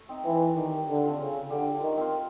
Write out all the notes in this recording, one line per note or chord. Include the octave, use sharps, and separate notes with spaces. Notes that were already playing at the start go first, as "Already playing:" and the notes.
Already playing: A3
C4 D#4
E3
D#3 G3
D3
C4 F4
C#3
D3 G3
D#3
C4 F4